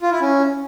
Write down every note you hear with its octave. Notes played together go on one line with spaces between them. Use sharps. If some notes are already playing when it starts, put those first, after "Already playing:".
F4
E4
C#4